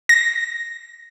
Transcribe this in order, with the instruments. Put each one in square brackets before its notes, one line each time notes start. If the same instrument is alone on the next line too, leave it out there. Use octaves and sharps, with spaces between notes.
[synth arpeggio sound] A#6